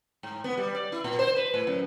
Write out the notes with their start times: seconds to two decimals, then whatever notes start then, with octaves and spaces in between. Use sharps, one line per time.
0.23 G#2
0.44 B3
0.57 G3
0.75 D5
0.92 E4
1.04 A#2
1.19 C5
1.36 B4
1.54 A2
1.67 F#2